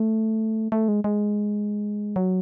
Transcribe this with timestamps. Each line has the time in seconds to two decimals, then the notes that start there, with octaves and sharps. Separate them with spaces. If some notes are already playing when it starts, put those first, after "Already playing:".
Already playing: A3
0.72 A3
0.88 G#3
1.04 G#3
2.16 F#3